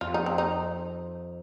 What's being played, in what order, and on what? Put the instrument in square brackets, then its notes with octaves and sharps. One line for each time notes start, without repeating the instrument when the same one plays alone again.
[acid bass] F2 [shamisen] F4
[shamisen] D#4
C4
D#4